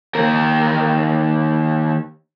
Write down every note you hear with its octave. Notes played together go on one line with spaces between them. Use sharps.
D#2 A#4